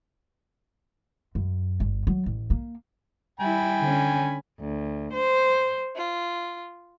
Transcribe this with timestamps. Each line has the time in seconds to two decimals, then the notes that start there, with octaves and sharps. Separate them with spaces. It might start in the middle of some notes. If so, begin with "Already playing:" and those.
1.35 F#2
1.80 G1
2.07 F#3
2.26 A1
2.50 A#3
3.40 G3 E4 G5 G#5 B5
3.81 D3 C#4
4.59 D2
5.12 C5
5.97 F4